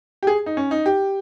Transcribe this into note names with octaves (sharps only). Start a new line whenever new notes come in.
G4
G#4
D#4
C#4
D#4
G4